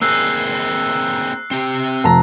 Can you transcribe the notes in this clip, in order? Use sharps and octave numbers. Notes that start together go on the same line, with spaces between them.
A#3 C4 G#4 E6 F#6 C7
C4 G4
F1 A5 A#5